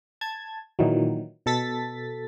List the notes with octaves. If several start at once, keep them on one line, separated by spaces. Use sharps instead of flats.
A5 G#6
A#2 D#3 E3 F#3
B2 A4 A6 B6